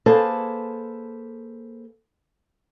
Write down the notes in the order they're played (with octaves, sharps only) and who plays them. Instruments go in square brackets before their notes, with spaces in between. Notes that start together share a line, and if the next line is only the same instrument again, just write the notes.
[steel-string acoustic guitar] A#3 G#4 A4 B4 C5 A5